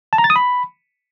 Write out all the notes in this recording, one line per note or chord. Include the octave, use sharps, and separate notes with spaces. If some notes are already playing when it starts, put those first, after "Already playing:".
A5
A#5
A6
D#6
B5